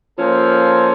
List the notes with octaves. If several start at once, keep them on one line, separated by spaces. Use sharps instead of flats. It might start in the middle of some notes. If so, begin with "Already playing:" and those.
F3 A#3 C#4 A4 C5